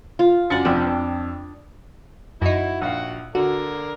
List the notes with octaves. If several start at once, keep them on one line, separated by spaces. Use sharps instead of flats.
F4
F#2 D5 F#5 G#5 A6 C#7
F1 F2 D4 G5
F2
F#2 D#4 E4 F#4
A#1 F#4 F5 F#5
D3 F#4 A#4 D5